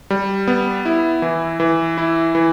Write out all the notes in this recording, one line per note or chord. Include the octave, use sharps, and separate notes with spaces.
G3
B3
E4
E3
E3
E4
E3